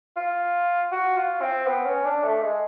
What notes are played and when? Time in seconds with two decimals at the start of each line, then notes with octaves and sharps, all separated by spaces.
0.16 F4
0.92 F#4
1.16 F4
1.41 C4
1.67 B3
1.85 C#4
2.05 D4
2.23 A3
2.42 G#3